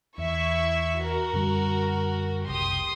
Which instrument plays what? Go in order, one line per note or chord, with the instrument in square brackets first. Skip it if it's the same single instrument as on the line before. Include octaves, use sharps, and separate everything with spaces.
[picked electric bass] E2 [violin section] E4 E5 C#6
[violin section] F#4 A#4
[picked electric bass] F#2 D3 G3
[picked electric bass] F#1 C2 [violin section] G4 C6 D#6